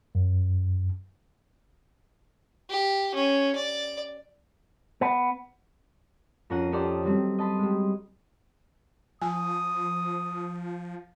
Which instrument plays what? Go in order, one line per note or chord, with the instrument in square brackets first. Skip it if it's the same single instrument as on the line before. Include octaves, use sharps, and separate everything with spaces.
[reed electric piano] F#2
[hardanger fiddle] G4
C#4
D5
[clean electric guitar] B3
[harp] F2 C#4 A#4 F#5 C7 D#7
C#4 G4 A4 C5 D5 D#5
D#3 F#3 G3 C4
D#5 A5 B5 C6
G3 G#3
[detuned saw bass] F3 [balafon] G#5 [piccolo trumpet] D#6